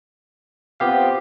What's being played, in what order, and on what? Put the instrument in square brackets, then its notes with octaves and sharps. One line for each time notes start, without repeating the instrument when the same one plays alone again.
[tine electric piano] B3 G4 F5 [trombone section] C4 F4